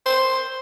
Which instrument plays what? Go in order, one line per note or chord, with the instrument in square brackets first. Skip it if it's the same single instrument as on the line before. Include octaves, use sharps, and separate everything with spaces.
[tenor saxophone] C5